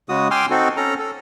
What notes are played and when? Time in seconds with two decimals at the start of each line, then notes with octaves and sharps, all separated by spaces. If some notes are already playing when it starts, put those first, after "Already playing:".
0.09 C#3 G#3 F#4 D#6
0.31 G5 G#5 C6 D6 E6 F6
0.50 C4 D#4 F#4 A4
0.77 C#4 A4 A#5
0.99 A4